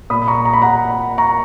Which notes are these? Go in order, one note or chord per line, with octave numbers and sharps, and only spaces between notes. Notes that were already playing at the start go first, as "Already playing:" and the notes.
A#2 B5 D#6
B5
A#5 C#6
A#5
B5
F#5 A#5
A#5 C#6